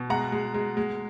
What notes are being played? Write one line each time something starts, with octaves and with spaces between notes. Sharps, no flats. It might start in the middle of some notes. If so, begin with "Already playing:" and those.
Already playing: B2
G#3 F#5 A#5
G#3
G#3
G#3